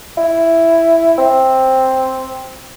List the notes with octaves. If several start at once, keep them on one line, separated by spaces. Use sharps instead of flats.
E4
C4